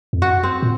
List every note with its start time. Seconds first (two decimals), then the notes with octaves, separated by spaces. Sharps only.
0.13 F2
0.22 F#2 F#4
0.43 C4
0.62 A#2